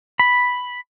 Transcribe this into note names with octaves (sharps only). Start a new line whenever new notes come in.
B5